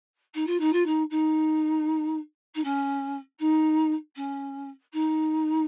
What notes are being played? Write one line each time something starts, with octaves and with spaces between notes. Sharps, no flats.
D#4
F4
D#4
F4
D#4
D#4
D#4
C#4
D#4
C#4
D#4